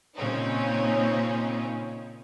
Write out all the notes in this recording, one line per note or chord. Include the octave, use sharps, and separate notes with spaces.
A#2 C#3 C4 C#4 D#4